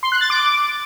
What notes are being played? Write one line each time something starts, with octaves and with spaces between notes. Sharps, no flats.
C6
F#6
A6
D6